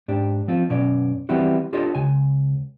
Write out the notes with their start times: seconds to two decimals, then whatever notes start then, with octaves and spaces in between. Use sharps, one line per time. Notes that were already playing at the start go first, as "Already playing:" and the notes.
0.08 G#2 D4 G4
0.48 F3 C4 F4
0.69 F#2 B2 C#4 D5
1.29 E3 G3 B3 C4 E4 F#4
1.73 D4 F4 G4 A4 C#5 D#5
1.95 C#2 C#3 G#5